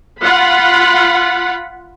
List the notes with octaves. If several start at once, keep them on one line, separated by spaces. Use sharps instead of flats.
F4 F#5 B5